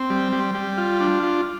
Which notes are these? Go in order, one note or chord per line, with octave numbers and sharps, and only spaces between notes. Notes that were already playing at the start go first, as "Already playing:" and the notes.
Already playing: C4
G3
G3
G3
F4
D4
F4